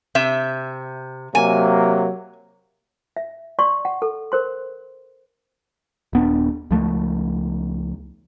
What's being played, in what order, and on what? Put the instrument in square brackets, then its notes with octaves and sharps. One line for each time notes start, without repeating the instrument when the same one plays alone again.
[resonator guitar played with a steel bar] C3 E5
[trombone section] C3 F#3 A#3 [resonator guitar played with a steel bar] G#5
[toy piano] E5
D5 C6 C#6
F#5
A4
A#4 C5 C6
[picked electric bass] D#1 B3 D4
C#2 F3 A3